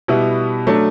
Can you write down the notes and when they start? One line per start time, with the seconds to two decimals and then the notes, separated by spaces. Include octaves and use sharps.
0.08 B2 G3 B3 E4
0.67 F#3 A3 D4